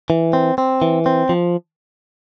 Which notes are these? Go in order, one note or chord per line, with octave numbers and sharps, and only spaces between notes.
E3
C4
C4
E3
C4
F3